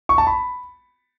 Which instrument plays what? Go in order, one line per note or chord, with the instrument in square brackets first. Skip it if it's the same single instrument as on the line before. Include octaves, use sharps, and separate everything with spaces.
[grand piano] C#6
A5
B5